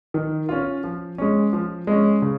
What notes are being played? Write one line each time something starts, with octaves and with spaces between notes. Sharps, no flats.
D#3
C#4 F4
F3
G#3 C#4
F3
G#3 C#4
C#3